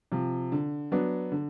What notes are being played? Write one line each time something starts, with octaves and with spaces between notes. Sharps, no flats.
C3 F3
D3
F#3 B3 D4
D3